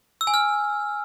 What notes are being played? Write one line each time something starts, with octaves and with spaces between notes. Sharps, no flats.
E6
G#5
F6